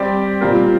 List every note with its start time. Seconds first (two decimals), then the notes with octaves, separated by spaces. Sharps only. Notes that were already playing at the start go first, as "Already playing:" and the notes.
Already playing: G3 C4 G4 D5
0.41 A#2 G3 C4 F4 A#4